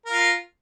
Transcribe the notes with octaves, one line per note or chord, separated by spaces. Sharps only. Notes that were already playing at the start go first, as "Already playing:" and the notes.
F4 A#4 F5